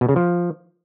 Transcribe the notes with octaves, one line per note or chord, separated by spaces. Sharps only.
B2
C#3
F3